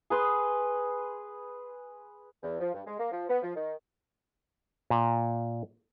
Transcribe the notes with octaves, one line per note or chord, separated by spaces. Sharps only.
G#4 B4 C6
E2
F3
G2
G#3
A#3
F3
B3
F3
D#3
A#2